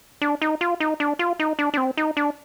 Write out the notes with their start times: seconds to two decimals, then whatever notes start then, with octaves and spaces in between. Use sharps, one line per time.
0.21 D4
0.42 D#4
0.61 F4
0.80 D#4
1.00 D4
1.19 F4
1.39 D#4
1.59 D4
1.74 D4
1.77 C4
1.97 D#4
2.17 D4